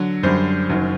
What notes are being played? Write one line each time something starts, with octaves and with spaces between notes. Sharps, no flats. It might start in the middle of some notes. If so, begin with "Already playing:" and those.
Already playing: D3 F#3
F#2 D3 G3 C5
F#1 F#2 D#3 F#3